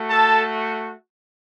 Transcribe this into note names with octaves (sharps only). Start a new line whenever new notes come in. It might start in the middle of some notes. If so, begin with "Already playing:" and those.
Already playing: A3 F#4
A4 A5